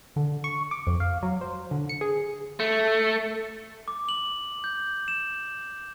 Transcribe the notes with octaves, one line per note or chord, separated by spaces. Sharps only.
D3
C#6
D6
F2
F5
F#3
C5
D3
C#7
G#4
A3
D6
F#7
G6
E7